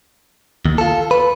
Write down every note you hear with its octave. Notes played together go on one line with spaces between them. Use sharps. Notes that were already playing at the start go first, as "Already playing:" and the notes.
D#2
F4 A4
B4